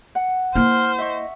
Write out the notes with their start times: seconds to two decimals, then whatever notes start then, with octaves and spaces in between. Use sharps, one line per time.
0.15 F#5
0.55 A#3 E4 C5 F6
0.98 D#5 E5 C#6